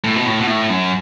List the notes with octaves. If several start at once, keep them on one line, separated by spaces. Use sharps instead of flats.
A2
B2
A2
B2
A2
F#2